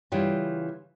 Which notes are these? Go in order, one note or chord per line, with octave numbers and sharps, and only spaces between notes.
C#3 E3 G3 F4 G5